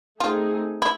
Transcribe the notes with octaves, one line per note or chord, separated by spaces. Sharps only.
A3 C4 D#4 F4 G#4
E4